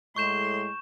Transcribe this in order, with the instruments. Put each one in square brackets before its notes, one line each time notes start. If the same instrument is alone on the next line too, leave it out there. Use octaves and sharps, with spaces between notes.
[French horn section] A2 G#3 [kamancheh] C6 [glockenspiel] C#6 G6 E7